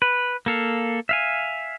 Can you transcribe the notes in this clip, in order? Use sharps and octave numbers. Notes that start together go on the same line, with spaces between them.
B4
A#3 A4 F5
E5 F5 G#5